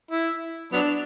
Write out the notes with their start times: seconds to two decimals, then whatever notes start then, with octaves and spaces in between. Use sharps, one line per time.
0.11 E4
0.72 F#3 B3 D4